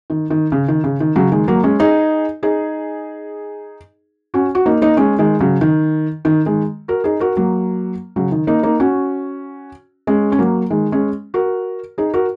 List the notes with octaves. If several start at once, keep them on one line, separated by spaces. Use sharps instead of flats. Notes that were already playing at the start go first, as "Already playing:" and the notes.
D#3
D#3
C#3
D#3
C#3
D#3
C#3 F#3
D#3 G#3
F#3 A#3
G#3 C#4
D#4 G#4
D#4 G#4
C#4 F#4
F#4
A#3 D#4
A#3 D#4
G#3 C#4
D#3 G#3
C#3 F#3
D#3
D#3
D#3 G#3
F#4 A#4
D#4 G#4
F#4 A#4
F#3 A#3
C#3 F#3
D#3
A#3 D#4
A#3 D#4
C#4 F#4
G#3 C#4
C#4
F#3 A#3
D#3 G#3
G#3 C#4
F#4 A#4
D#4 G#4
F#4 A#4